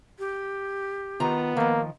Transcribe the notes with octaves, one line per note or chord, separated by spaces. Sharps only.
G4
D#3 B3 F4 A#5
D#3 F3 A#3